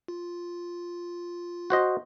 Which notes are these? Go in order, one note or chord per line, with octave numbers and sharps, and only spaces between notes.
F4
F#4 C5 D#5